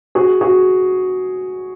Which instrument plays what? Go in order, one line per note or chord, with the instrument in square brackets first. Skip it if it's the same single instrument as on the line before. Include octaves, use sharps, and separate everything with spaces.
[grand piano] F#4 G#4
F#4 G#4